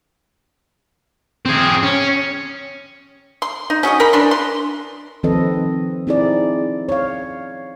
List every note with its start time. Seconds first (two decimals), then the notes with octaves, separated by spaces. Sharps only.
1.46 C4 G#4
1.83 C#4
3.42 C6
3.70 D#4
3.83 C#4 F#4 G#4 D#5
4.00 A#4 B5
4.13 E3 D4 C6
4.31 C6
5.23 D#3 F3 C4 A4 B4 D#5
6.07 C4 D#4 E4 G#4 D5
6.89 C#5 F5